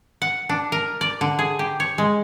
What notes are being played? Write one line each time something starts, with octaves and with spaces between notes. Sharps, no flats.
F#5
D4
A#4
D5
D3
G#4
G4
C#5
G#3